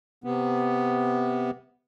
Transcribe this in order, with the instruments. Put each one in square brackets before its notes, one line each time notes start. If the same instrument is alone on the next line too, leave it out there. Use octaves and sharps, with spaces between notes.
[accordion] C3 B3